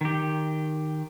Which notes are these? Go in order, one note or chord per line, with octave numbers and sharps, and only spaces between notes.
D#3 G4